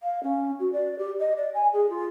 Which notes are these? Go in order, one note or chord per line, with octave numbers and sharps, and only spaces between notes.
F5
C#4
F#4
D5
G4
D#5
D5
G#5
G#4
F4